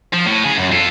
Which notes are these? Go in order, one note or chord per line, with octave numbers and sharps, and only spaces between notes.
F3
A2
C#3 G#4
F#2
F4 A4